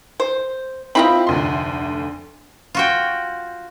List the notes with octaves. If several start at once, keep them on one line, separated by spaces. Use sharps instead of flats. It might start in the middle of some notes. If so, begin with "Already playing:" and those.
C5
C4 E4 F4 D#5 G5 B5
F1 D2 C6
F4 F#4 G5